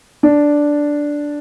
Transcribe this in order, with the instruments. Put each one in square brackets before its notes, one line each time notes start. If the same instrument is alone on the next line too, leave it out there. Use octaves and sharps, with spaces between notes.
[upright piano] D4